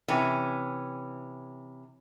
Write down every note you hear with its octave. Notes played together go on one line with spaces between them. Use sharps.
C3 E3 C#4